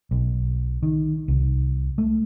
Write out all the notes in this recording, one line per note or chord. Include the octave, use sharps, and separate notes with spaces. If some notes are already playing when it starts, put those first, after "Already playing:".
B1
D#3
C2
A3